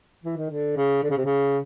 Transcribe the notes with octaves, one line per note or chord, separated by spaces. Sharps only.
E3
D#3
D3
C#3
D3
C#3
C3
C#3